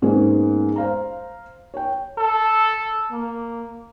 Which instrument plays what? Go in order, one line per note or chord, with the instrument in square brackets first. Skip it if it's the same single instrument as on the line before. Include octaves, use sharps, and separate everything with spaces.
[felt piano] G#2 G#3 A#3 B3 C#4
C5 F5 A#5
C#5 G5
[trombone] A4
A#3